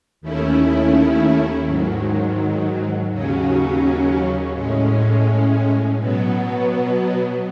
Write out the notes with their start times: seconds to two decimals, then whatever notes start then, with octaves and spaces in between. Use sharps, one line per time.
0.21 D#2 D#3 A3 C#4 E4
1.65 G#2 D#3 F#3
3.10 D#2 C#3 F#3 C#4
4.53 A2 G#3 C#4
5.97 B2 F#3 B3